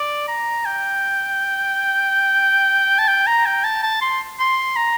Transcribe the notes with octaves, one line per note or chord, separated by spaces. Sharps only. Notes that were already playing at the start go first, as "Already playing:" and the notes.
Already playing: D5
A#5
G5
A5
G5
A#5
G5
A5
A5
C6
C6
A#5